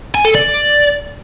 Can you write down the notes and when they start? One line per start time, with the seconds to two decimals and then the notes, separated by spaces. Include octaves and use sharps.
0.15 G#5
0.25 A4
0.35 D5